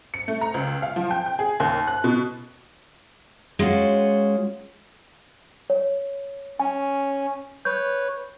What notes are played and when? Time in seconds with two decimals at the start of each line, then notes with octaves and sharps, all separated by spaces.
0.14 C#7
0.28 A3
0.41 A#5
0.54 C#2
0.82 F5
0.96 F3
1.11 G5
1.26 G5
1.39 G#4
1.60 D#2
1.87 F#6
2.04 B2
3.59 G#3 C#4 F4 F#4
5.70 C#5
6.60 C#4 G#5
7.65 B4 C#5 G6